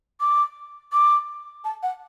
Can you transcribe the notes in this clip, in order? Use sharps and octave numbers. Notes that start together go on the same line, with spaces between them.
D6
D6
A5
F#5